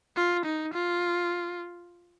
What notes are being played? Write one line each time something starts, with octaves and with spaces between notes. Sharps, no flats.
F4
D#4
F4